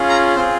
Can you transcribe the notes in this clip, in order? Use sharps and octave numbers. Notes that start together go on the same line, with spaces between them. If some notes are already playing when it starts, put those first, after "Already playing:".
Already playing: C#4 F4 G#4
A#5
C4 F4 G#4 C5